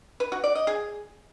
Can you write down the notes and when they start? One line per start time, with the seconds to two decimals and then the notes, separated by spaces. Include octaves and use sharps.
0.20 B4
0.32 F#4
0.44 D5
0.55 D#5
0.67 G#4